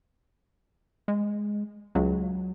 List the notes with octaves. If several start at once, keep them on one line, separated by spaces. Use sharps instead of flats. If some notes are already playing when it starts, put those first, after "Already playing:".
G#3
C#2 F#3